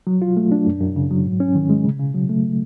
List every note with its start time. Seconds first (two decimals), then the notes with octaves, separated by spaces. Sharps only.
0.07 F#3
0.22 F4
0.37 A3
0.52 D4
0.67 F#2
0.81 F#2
0.96 C#3
1.11 F#3
1.25 G#2
1.40 C#4
1.55 D#3
1.70 G#3
1.85 C#3
1.99 C#3
2.14 F#3
2.29 A3